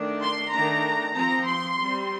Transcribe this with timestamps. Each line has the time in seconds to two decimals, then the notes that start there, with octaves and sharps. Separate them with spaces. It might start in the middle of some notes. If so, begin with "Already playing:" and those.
Already playing: D#3 A3 D4
0.21 C6
0.52 D#3 A3 D4 A#5
1.14 F3 C4 A#5
1.46 C6
1.77 G3 C4